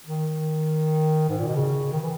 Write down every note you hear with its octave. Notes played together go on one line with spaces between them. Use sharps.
D#3
G#2
A#2
B2
C#3
D#3
E3